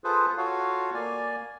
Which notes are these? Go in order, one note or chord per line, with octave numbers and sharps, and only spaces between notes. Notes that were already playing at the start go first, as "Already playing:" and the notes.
F4 G#4 A4 B4 C5
F4 F#4 A4 C#5 F5
A#3 D5 G#5